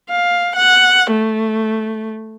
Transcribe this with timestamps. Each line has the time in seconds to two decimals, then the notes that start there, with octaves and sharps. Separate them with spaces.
0.10 F5
0.56 F#5
1.11 A3